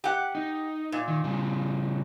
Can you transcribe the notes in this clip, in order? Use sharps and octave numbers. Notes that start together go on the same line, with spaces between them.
G4 F#5
D#4
A#2
D#3
C#3 G3